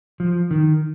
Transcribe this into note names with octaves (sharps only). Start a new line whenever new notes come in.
F3
D#3